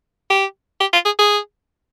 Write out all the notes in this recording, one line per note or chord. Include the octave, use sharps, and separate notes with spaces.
G4
G4
F4
G#4
G#4